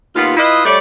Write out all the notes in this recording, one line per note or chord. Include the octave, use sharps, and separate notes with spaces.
D#2 B3 F4
E4 F4 B4 D#5
G3 A3 C#5 D5